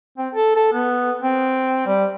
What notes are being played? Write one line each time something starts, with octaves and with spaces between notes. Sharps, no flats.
C4
A4
A4
B3
C4
G3